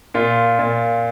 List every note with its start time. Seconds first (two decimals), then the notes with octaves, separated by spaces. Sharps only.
0.14 A#2 F4
0.59 A#2